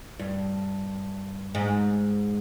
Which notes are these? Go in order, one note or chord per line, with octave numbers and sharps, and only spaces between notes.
G2
G#2